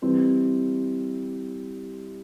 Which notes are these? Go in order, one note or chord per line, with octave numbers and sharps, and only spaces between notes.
E3 G3 C4